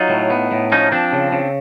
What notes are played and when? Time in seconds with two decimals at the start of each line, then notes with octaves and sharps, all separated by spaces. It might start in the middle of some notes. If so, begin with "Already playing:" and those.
Already playing: F#3 D#4 F4
0.10 A2
0.30 B3
0.52 A2
0.72 F3 C#4 D#4
0.92 F3 C4 D4
1.13 C#3
1.32 C#3